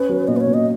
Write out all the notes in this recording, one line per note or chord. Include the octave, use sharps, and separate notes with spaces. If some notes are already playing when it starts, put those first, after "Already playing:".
Already playing: C#4 B4
F#3
A#2 D#5
B4
C#5
A#2
D#5